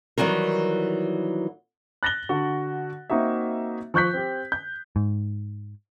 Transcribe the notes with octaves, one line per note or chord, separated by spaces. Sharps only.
D#3 E3 F#3 G3 A#4
F#6 A6 A#6 F#7 G7
D3 F#4
A#3 C4 D#4 F#4 E5
F3 C#6 F#6 G6 B6
C4 G4
G6
G#2